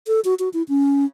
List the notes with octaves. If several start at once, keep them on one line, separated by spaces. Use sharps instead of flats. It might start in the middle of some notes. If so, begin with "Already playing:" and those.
A4
F#4
F#4
E4
C#4